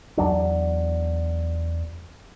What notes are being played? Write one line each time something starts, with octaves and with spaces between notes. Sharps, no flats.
E2 F#3 D4